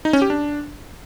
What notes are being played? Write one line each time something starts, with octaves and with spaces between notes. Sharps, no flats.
D#4
C#4
G4
D4